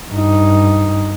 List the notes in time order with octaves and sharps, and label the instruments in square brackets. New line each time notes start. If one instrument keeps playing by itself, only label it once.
[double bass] G2 D#4